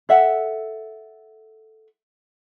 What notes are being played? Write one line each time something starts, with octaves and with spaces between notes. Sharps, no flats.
A4 E5 F#5